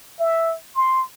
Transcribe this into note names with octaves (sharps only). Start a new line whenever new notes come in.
E5
C6